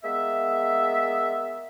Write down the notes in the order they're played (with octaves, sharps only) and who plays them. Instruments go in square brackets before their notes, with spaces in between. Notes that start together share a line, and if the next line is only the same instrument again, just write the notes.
[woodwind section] G#3 A#3 B3 E5